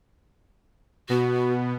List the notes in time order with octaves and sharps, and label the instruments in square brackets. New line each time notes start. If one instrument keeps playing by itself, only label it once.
[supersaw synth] B2 B3 [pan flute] F#4